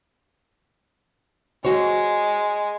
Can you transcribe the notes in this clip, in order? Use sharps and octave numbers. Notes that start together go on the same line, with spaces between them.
G#3 F#4 C5 C#5